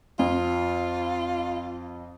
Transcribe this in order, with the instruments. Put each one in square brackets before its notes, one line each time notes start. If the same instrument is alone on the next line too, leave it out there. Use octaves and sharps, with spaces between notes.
[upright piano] F2 [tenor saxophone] F4